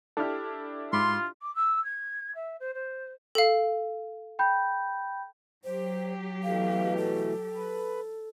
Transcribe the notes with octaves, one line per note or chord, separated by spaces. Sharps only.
D4 E4 G4 A4 F6
G#2 F4 B5 C6 D6
D6
E6
G#6
E5
C5
C5
A4 F5
G5 B5 G6
F#3 G4 C5
B2 E3 A3 F5
A4
B4